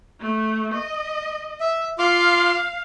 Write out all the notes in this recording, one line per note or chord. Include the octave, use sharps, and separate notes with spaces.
A3
D#5
E5
F4 F5 C6 D6